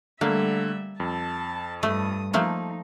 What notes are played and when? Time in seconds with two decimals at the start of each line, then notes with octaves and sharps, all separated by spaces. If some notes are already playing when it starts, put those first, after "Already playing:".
0.21 D3 G3 A3 A#3 E5
1.00 F2 A5
1.83 G2 A3 D#6
2.33 F3 A3 A#3 D#4